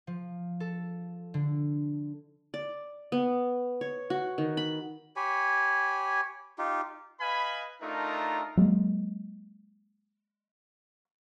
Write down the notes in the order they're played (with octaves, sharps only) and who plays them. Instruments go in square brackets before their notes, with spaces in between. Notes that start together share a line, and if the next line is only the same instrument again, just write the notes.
[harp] F3
A4
D3
[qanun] D5
B3
C#5
F#4
D#3
B5
[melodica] G4 C#5 G#5 B5
D#4 F4 G4
[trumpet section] B4 D#5 F5 G#5 B5
A3 D4 D#4 F4 A#4 A#5
[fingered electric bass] F#3 G#3 A#3